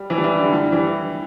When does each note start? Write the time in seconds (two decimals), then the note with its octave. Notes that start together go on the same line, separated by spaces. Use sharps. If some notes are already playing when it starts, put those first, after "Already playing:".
Already playing: G3
0.10 E3
0.18 G3
0.24 E3
0.38 D3
0.52 G3
0.72 E3